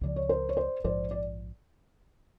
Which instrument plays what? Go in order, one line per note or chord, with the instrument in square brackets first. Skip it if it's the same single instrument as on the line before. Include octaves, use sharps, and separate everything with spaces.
[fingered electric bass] C#2 C#3 F3 [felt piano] D5
[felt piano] C#5
A#4 C5
C#5
C5 D5
[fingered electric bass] A#1 G#2 F3 [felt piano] C5 D5
[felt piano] D5